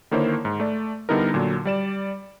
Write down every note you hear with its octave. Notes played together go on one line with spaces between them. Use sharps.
D3 D#3 A#3 E4 C5 C#5
G#2
A3 D5
D3 G3 B3 D#4 E4 A#4
A#2 D3 F#3
G3 D5 E7